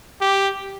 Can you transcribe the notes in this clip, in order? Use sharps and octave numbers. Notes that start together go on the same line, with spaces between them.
G4